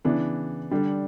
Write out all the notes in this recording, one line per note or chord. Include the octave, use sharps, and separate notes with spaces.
C#3 E3 B3 D4
D3 G3 D4